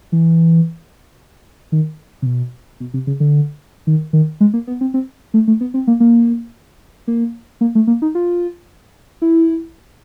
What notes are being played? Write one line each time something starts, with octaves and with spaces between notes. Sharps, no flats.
E3
D#3
C3
B2
B2
C3
C#3
D3
D#3
D#3
G#3
A#3
B3
C4
C4
A3
A3
B3
C4
A#3
A#3
A#3
A#3
A3
A#3
D#4
F4
E4